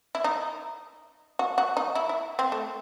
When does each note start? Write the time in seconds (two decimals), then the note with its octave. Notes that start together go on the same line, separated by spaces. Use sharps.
0.15 E4
0.24 D#4
1.39 F#4
1.58 F#4
1.77 D#4
1.95 E4
2.09 E4
2.39 C4
2.52 A3